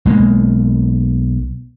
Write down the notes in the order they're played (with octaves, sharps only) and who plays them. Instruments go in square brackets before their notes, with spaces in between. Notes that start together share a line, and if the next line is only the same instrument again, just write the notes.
[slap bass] B1 G#3 A#3